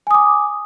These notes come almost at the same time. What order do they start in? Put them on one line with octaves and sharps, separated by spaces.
G#5 D#6 D6